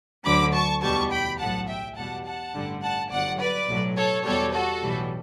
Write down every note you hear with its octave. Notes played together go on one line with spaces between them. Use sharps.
D2 D3 F#3 B5 D6
A5 C#6
E2 B2 G3 A5 C#6
G5 B5
B1 A2 F#3 F#5 A5
E5 G5
E2 B2 G3 F#5 A5
F#5 A5
A1 G2 D3 G3
F#5 A5
G1 G2 F#3 D5 F#5
B4 D5
B1 A2 F#3
A4 C#5
E2 B2 G3 A4 C#5
F#4 A4
B1 A2 E3 G3